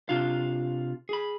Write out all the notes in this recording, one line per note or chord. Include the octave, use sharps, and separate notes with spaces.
C3 D4 F4 F5
G#4 B5